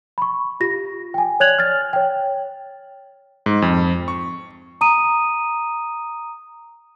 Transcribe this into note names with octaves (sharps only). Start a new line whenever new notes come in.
B5 C#6
F4 G4 A#6
G5 G#5
C#5 D5 F#6 G#6 F7 F#7
F6 A6
C#5 G5
G#2
F2
C#6
A#5 D#6 D#7